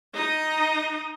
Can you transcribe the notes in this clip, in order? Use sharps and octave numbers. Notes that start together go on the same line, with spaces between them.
D#4 D#5